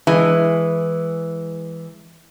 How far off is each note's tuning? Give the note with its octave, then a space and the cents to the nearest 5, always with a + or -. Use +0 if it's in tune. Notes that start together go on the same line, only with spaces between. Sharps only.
E3 +0 G#3 -10